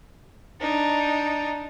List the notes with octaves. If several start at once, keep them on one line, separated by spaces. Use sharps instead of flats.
D4 D#4